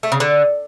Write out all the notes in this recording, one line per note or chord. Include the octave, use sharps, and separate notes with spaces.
A3
C#3
D3